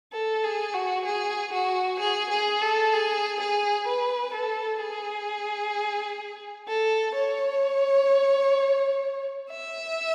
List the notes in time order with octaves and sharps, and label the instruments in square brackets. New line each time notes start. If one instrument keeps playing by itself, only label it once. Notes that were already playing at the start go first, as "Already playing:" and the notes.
[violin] A4
G#4
F#4
G#4
F#4
G#4
G#4
A4
G#4
G#4
B4
A4
G#4
A4
C#5
E5